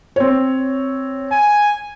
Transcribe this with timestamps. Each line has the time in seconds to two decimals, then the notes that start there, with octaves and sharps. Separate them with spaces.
0.16 C4 C#5
1.31 G#5